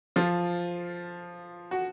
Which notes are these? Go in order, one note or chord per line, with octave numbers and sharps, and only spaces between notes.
F3 F4
F#4